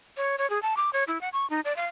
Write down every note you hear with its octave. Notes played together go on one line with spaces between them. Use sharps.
C#5
C#5
G#4
A5
D6
C#5
E4
F#5
C#6
D#4
D5
F5